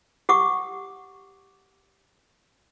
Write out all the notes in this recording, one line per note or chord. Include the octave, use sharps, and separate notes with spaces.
G4 F#5 D6 D#6